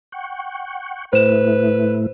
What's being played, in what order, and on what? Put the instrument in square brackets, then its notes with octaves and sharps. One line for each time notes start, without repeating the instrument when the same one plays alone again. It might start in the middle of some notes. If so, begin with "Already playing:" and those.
[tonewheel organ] F#5 G5 C#6
[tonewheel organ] A2 A3 E4 [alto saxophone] B4 [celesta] C5 E7